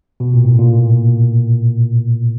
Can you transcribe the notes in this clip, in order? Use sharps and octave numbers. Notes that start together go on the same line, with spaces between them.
B2
A#2
A2
A#2